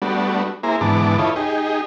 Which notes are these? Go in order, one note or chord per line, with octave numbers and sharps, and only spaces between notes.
G3 A3 B3 D4 F#4
A#3 E4 G#4 C5 A#5
G#2 D3 E3 B3 A5 D6
E4 F4 A4 B4 C#5 D#5
D#4 G4 G#4